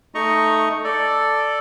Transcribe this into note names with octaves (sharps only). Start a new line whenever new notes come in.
A3 D#4 D#5 A#5 C#6
A4 D5